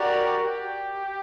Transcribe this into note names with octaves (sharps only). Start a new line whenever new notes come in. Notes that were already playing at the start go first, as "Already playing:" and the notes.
Already playing: F#4 G4 A#4 D5
G4